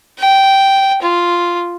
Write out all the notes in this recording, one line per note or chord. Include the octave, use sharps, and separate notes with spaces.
G5
F4